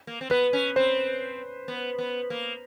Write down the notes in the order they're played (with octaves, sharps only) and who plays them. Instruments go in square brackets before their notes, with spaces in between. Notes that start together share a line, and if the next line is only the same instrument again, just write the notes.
[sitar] A#3
C4
[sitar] B3 [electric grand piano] B4
[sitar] C#4
[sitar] C4 [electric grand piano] C5
[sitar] B3
B3
A#3